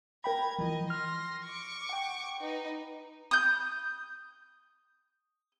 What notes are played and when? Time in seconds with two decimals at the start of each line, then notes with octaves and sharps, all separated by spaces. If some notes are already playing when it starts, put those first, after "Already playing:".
0.24 A#4 G5 A#5 B5 G#6
0.59 E3 F3 D#5
0.90 C6 F6 A#6
1.44 C#6 D6
1.89 F#5 G5
2.39 D#4 B4
3.31 D#6 G6